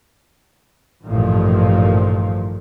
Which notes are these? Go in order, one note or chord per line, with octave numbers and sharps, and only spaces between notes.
A1 G2 A#2 D#3 F3